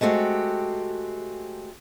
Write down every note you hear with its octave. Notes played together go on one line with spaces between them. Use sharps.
G#3 A3 C4 F#4 G4